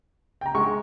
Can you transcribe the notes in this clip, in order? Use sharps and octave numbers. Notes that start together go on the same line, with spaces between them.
G5 A#5
G#3 C#6